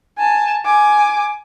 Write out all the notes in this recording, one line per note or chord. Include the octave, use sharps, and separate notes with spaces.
G#5 A5
G#5 D6